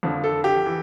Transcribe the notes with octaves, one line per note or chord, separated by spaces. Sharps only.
F2 D3 F3
A4
G4
E3